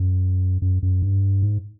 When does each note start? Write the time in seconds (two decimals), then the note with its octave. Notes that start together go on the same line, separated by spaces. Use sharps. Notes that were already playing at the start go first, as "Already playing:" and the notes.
Already playing: F#2
0.62 F#2
0.83 F#2
1.02 G2
1.42 G#2